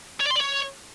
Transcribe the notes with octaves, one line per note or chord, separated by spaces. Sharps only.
C#5
D5
C6
D5
C#5